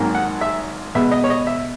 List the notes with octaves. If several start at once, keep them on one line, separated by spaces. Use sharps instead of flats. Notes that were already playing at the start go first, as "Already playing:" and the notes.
Already playing: G#1 G#2 D#3 F#3 A#3
F#5
E5
B2 G#3 B3 E5
D#5
C#5
D#5
E5